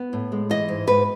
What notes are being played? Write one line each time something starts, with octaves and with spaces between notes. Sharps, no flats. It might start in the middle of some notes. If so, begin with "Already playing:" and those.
Already playing: B3
A2
G#3
E3 D#5
G#2
G#2 B4